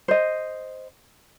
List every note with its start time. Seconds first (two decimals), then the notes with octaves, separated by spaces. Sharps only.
0.08 C5 D#5